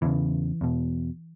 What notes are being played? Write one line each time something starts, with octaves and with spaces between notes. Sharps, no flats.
E2 C#3 E3
E2 B2